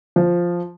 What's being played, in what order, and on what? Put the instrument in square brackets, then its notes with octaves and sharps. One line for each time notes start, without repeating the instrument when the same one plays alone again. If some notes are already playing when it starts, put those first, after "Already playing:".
[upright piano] F3